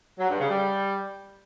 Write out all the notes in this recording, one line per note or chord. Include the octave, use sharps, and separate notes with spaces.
F#3
G2
C#3
G3